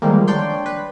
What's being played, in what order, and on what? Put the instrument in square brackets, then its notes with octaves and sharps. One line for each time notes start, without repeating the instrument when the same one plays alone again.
[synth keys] D3 D#3 F3 G3 G#3 A#3
D4 C#5 D5 G5 C6
B4